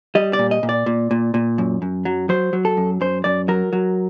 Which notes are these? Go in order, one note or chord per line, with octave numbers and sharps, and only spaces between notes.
G3 D#5
D5
A#2
D#5
A#2
D5
A#2
A#2
A#2
F#2
F#2
F#3
F#3 C5
F#3
A4
F#2
F#2 C5
F#2 D5
F#3 A#4
F#3